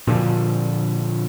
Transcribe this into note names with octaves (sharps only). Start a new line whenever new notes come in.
A#2 D3 F3